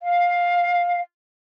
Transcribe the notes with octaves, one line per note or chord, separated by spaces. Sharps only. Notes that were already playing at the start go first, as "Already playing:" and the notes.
F5